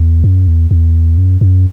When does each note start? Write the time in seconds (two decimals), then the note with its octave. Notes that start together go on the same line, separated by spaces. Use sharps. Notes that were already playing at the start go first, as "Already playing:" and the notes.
Already playing: E2
0.24 F#2
0.48 E2
0.71 E2
1.18 F#2
1.41 F#2